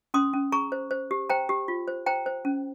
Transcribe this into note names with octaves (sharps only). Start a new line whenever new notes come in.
C#4 C6 D#6
C#4
G#4 A#5 C#6
C5
C5
G4
C5 G5 A#5
G4
F4
C5
C5 G5 A#5
C5
C#4